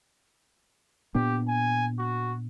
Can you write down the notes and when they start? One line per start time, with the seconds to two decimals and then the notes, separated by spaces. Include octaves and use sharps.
1.15 A#2 B3 D4 G4
1.48 G#5
1.99 F#4